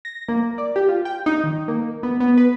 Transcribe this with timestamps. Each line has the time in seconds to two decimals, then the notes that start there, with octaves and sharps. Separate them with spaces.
0.05 A#6
0.29 A#3
0.58 D5
0.76 G4
0.89 F4
1.05 G5
1.26 D#4
1.44 D#3
1.68 A#3
2.03 B3
2.20 B3
2.38 B4